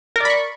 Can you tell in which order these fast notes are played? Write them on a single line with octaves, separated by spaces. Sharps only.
A#4 D5 B5 C#6